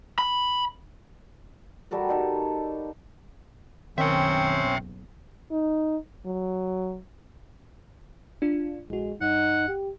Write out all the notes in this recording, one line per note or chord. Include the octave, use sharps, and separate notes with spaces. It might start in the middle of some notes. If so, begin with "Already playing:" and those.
B5
G3 F#4 A4 A#4
G3 D#4 A4 A#4
F#1 B1 D#3 C4 C#4 C5 E5 G5
D#4
F#3
D4 F4
A#1 G#3 F#4
G2 D#4 F#5
G4